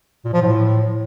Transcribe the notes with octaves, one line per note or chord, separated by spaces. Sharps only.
A#2
F3
A2